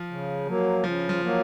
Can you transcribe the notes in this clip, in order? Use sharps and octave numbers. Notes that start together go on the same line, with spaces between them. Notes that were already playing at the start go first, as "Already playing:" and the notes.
Already playing: F3
C#3
F#3 A#3
C#3 F3
F3
F#3 A#3